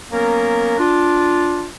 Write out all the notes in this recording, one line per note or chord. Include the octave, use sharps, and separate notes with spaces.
F#3 A#3 B3 C#4 A#4
D4 F4